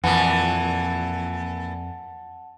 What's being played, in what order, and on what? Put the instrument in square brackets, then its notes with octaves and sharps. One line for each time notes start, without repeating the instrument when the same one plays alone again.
[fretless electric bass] F2 [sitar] A#2 E3 [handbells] F#5 A5